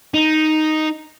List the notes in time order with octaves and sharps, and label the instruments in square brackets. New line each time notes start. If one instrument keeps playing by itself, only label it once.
[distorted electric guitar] D#4